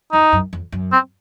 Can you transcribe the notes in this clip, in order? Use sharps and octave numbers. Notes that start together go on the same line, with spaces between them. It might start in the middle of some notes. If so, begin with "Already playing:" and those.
F2 D#4
F#2
F2
F#2
C4